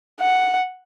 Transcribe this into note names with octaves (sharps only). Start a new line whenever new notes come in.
F#5